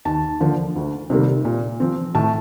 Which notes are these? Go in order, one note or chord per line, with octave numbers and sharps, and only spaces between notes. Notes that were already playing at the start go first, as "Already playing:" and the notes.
D#2 A5
D3 F3 A#3
D2
C3 D#3 G3 A#3
A#2
F3 C4
A2 A5